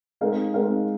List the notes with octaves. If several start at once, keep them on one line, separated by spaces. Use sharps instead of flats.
G#3 C4 D#4 A#4 F5
G#3 C4 D#4 A#4 F5